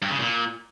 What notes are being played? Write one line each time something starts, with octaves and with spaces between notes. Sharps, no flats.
G2
C#3
A#2